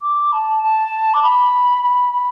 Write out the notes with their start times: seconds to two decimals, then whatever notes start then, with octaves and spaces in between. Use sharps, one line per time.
0.02 D6
0.32 A5
0.62 A5
1.14 D6
1.23 B5
1.83 B5
2.13 B5